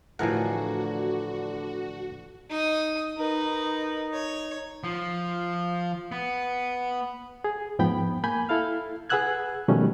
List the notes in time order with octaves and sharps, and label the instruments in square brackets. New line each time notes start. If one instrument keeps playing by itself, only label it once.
[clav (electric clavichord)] A2 F#5 [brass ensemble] D3 D4 [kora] E3 F3 A#4 [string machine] F#4
[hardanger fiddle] D#4 D#6
[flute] D#4 [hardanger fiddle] A#4 B4
[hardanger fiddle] C#5
[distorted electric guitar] F3
B3
[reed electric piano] G#4
E2 G#2 F3 B3 G5 B5
A#3 G#5 B5 G6
E4 A4 F5 F6
G#4 B4 F#5 E6 F#6 G#6
B2 D#3 F3 G3 A3 C#4